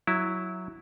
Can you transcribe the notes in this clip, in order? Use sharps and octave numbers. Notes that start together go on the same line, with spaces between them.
F#3 E4